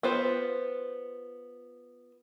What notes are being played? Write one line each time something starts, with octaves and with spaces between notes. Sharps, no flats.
B3 F4 C5